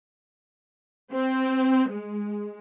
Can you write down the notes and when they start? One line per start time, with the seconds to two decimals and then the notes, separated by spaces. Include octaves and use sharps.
1.13 C4
1.92 G#3